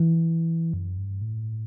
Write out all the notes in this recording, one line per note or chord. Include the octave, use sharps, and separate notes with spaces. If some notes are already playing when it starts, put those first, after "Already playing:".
Already playing: E3
F#2
G2
A2